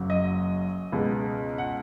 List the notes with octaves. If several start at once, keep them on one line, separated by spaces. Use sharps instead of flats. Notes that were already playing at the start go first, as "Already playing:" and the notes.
Already playing: F#1 F#2 F#3
D#5
C#2 B2 G#3 B3
F#5